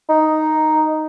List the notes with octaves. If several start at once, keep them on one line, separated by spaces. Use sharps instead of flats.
D#4